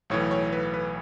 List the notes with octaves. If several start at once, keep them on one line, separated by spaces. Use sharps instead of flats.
B1 A2 E3 C#5
C#5
B4
B4